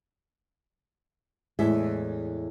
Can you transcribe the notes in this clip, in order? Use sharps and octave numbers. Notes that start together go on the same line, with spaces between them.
E2 A2 G#3 E5